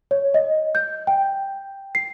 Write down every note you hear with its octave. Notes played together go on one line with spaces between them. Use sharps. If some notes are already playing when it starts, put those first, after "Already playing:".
C#5
D#5
G6
G5
C7